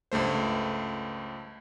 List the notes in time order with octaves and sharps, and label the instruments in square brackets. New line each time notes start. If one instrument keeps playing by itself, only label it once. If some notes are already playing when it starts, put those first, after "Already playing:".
[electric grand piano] C#2 G2 A3 C5